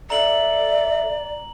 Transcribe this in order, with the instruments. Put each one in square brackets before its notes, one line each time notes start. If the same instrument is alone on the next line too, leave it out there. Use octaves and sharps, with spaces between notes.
[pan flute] A4 [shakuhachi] D5 [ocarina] E5 [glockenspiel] A#5 F#7